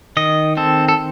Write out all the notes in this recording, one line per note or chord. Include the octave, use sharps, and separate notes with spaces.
D#3 D#5
C4 A4
A4